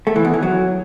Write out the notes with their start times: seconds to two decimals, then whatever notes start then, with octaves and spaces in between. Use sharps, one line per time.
0.07 A3
0.16 E3
0.25 E2
0.34 E3
0.43 F#3